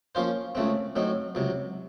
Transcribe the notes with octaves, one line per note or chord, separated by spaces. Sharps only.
F3 A#3 C#4 F4 C5
C#2 C#3 A3 C4
A2 F#3 C4 D#4
C#2 C3 F#3